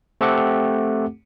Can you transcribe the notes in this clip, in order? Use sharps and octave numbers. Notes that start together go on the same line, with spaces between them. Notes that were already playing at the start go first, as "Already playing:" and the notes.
A3 C4 G4 A4 F#5 D6